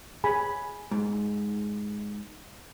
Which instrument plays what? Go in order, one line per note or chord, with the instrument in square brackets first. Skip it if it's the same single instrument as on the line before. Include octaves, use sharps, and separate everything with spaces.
[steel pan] G#4 G#5 B5
[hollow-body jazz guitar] G#2